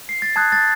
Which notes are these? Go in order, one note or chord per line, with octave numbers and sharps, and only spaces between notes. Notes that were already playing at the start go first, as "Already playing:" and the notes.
C7
A6
A5 D#6 F#6 G#6
A6